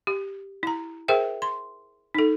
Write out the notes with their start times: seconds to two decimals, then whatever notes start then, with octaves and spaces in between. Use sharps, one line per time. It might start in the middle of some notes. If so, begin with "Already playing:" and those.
0.07 G4
0.63 E4 A#5
1.08 G#4 A#4 C5 E5 G5
1.42 C6
2.15 D#4 A4